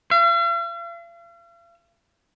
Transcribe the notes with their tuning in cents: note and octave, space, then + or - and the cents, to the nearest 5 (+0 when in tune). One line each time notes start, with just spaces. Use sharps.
F5 -45